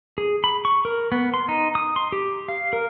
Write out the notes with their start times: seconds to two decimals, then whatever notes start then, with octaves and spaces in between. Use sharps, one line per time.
0.18 G#4
0.44 B5
0.65 C#6
0.85 A#4
1.12 B3
1.34 C6
1.49 D#4
1.75 D#6
1.96 C6
2.12 G4
2.48 F5
2.73 A#4